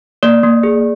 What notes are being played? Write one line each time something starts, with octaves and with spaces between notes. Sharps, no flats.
A#3 D5
A#3
G#4